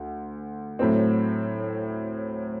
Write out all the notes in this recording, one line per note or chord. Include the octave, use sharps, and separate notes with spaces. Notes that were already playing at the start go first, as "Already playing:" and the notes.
Already playing: D2
A2 F#3 A3 C4